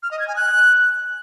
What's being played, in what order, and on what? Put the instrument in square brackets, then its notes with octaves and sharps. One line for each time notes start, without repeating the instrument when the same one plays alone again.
[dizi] F6
D#5
G#6
G#5
F#6